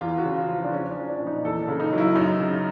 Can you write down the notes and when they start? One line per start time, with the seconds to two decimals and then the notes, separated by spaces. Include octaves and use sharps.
0.01 E2 F4
0.18 F#4
0.25 C#3
0.37 F4
0.48 F3
0.54 F4
0.64 D4
0.73 F3 C#4
0.90 D4
0.96 F3
1.09 D4
1.20 A#2
1.27 D#4
1.44 E2 A4
1.62 A4
1.68 C#3
1.80 D#4
1.93 F#3
1.98 E4
2.15 F#2 D#4
2.40 C#3